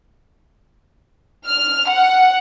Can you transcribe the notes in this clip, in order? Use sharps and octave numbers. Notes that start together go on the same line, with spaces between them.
F6
F#5